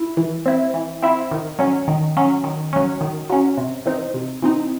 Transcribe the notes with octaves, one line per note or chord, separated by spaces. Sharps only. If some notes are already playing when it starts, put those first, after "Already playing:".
Already playing: E4
E3
C4 E4
E3
C4 E4
D#3
F#3 C#4
D#3
F#3 C#4
D#3
F#3 C#4
D#3
F#3 C#4
C3
E3 C4 D#4
C3
E3 C4 D#4